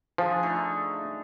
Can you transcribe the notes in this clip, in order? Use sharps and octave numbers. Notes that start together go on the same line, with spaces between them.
F3 D4 G#4
D3 A3 D#4